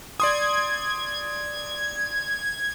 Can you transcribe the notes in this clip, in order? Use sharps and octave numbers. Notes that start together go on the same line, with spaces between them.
D5 C6 D#6 G#6